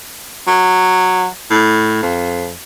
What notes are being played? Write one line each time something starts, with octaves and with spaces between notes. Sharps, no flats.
F#3
A2
F2